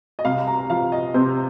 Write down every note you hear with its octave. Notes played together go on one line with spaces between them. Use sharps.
D#5
C2 F5
A#5
F3 F5
D#5
C3 C5